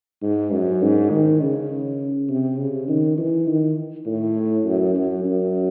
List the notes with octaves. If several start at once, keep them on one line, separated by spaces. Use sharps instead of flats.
G#2
F#2
G#2
D#3
C#3
C3
C#3
D#3
E3
D#3
A2
F#2
F#2
F#2